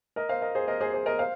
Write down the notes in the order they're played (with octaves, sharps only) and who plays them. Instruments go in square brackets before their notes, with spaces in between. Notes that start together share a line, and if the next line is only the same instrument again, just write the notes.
[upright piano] A#4 D#5
C5 F5
A#4 D#5
G#4 C5
A#4 D#5
G#4 C5
G#4 C5
A#4 D#5
C5 F5